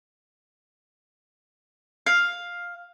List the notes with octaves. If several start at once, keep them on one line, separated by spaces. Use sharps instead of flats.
F5